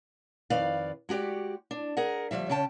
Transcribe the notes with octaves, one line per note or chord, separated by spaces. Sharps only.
F2 D#3 B4 D5 F5
G#3 F#4 G4 D5
D4
G#4 A#4 F#5
D2 G#2 F3 G3 E5
C#3 C#4 G5 A5